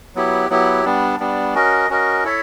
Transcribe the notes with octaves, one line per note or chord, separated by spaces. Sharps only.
F#3 B3 E4 G4
F#3 B3 E4 G4
G3 B3 D4
G3 B3 D4
C#4 F#4 A#4 D#5
C#4 F#4 A#4 D#5
E4 A4 C#5 E5